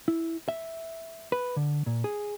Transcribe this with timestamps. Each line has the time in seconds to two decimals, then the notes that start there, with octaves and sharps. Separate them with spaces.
0.08 E4
0.49 E5
1.32 B4
1.56 D3
1.86 A#2
2.04 G#4